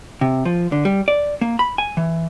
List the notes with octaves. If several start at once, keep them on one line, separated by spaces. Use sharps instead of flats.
C3
F3
D3
G3
D5
A#3
B5
G#5
E3